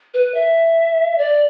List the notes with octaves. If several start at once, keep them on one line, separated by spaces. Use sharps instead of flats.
B4
E5
D5